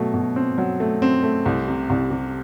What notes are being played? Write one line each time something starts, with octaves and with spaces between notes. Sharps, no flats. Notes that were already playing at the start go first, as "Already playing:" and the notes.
Already playing: B2 F#3 A3
B2
C4
F#3
A3
C4
A3
C2
C3
C2
C3